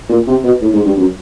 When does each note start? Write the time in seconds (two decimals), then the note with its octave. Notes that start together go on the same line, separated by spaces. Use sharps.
0.09 A#2
0.27 C3
0.43 B2
0.61 A2
0.73 G#2
0.85 G2
0.97 F#2